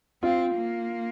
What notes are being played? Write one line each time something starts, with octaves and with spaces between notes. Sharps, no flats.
C4 F4
A#3